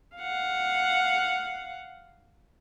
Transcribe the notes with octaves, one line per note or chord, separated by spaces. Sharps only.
F5 F#5